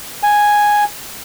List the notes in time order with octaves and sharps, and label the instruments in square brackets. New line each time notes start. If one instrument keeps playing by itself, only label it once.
[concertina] G#5